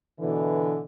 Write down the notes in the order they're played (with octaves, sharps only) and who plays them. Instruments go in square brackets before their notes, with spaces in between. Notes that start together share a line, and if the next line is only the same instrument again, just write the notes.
[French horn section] B2 D3 E3